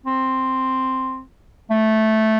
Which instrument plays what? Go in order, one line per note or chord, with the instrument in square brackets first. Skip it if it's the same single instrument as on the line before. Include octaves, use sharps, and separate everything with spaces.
[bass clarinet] C4
A3